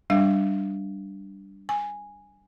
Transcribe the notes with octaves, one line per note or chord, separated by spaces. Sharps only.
G3 D4 F5
G#5